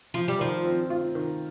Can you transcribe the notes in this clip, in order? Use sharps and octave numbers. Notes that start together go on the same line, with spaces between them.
F3 F4
G3
D#3 F3
C4
F4
D#3